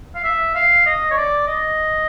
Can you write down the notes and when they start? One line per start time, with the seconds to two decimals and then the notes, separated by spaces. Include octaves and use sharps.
0.15 F5
0.24 E5
0.55 F5
0.86 D#5
1.11 C#5
1.17 D5
1.48 D#5